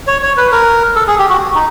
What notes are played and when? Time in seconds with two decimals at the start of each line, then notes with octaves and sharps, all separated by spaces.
0.07 C#5
0.23 C#5
0.37 B4
0.52 A#4
0.96 A4
1.07 G#4
1.19 G4
1.29 F#4
1.55 D#4